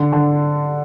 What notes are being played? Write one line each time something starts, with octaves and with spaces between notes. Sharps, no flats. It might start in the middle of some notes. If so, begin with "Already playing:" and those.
Already playing: D3
D3